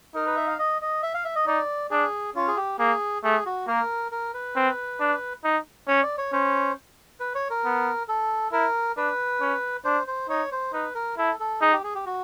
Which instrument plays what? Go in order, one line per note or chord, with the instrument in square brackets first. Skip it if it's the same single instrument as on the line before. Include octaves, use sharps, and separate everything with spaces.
[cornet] D#4 [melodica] A#4
[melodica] B4
E5
F5
D#5
D#5
E5
F5
E5
D#5
[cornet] D#4 [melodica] D5
[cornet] D4 [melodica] G#4
[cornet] C#4 [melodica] F4
[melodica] G#4
G4
[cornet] A#3 [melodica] G#4
[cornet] A3 [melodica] G#4
[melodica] F#4
[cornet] A#3 [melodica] A#4
[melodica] A#4
B4
[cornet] C4
D4
D#4
[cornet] C#4 [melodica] C#5
[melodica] D5
C#5
[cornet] C#4 [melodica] C5
[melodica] B4
C#5
A#4
[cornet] B3
[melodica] A4
[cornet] E4 [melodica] A#4
[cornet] D4 [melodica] B4
[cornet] C#4
[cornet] D4 [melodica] C5
[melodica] C5
[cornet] D#4 [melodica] C#5
[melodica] C5
[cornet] D#4 [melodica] B4
[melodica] A#4
[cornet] E4 [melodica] A4
[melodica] A4
[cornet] D#4 [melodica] G#4
[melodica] G4
G#4
G4
F#4